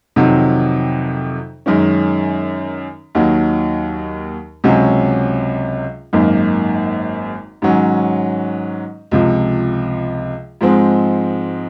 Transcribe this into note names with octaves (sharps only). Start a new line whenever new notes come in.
F2 C3 D#3 F#3
F#2 D#3 G#3 C#4
D#2 D#3 F#3
C#2 C3 F#3 C#4
G#1 F#2 D#3 A#3
G#2 D#3 F#3 C#4
C#2 C3 F3
G#2 F3 G#3 C4